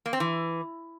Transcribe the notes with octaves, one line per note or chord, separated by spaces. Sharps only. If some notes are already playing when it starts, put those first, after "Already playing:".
A#3
C4
E3